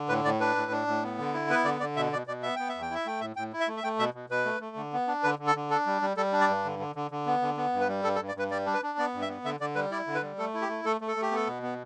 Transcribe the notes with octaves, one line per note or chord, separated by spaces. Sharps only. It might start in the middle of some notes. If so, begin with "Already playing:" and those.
Already playing: D3
A2 B4
A2 D5
D4 B4
A2
D4
A2
B3
D3
E4
B3 B4
D3 D5
D3 D5
B2 E5
B2 D5
B2 D5
B3 E5
B3 G5
E5
E2
G5
E4 E5
A3 G5
A2 E5
A2 G5
E4
E5
A3
E5
A3 G5
B2 E5
B2
B2 B4
A3
A3
D3
B3
D4
D3 B4
D3
A4
D3
D4 A4
G3
G3
G3 A4
D4
D5
G2
D3
D3
D3
D3
B3
D3
B3
G2
B4
G3
G2 A4
A4
G2
D5
G2 B4
G3 D5
D4
B4
D4
B3 D5
G2
E5
B3
D3 E5
D3 D5
G3 B4
E4 D5
D3
B4
G3
A3 A4
E4
G4
A3
A3 A4
A3
A4
A3
G4
B3 A4
B2
B3